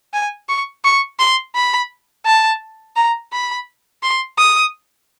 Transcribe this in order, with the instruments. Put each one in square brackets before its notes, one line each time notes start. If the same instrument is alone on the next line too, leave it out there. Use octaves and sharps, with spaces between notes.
[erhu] G#5
C#6
C#6
C6
B5
A5
A#5
B5
C6
D#6